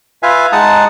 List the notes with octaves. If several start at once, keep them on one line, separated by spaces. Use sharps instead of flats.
F4 B4 E5 F5 G#5
G#3 D#4 F#5 A5 D#6